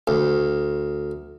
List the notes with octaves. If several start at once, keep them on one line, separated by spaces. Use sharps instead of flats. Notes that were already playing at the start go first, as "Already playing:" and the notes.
D2